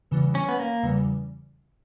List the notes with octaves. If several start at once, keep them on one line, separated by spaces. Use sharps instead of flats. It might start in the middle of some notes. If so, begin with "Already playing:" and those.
E2 C#3 E3 G3
C#4
B3
A#3
E2 C#3 E3 G3